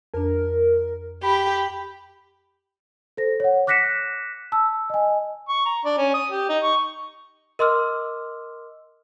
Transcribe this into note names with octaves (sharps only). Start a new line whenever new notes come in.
F2 D4 A#4
G4 B5
A4 C5 A#6
C#5 F#5
D6 F#6 A#6 B6 C#7 E7
A5 E6
D#5 G#5
C#6
A#5
D4
C#4
D#6
G4
D#4
C#6
A#4 D#5 C6 D6 E6 F6